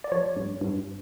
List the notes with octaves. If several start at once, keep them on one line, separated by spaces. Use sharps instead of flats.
D5
F3 C#5
G2
G2